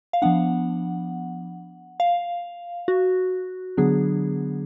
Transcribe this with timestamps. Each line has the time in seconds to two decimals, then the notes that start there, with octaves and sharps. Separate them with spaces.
0.13 F5
0.22 F3 B3 D4 F#5
2.00 F5
2.88 F#4
3.77 D3 F#3 B3 D4 G#4